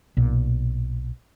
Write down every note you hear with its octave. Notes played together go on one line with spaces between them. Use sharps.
B1 A#2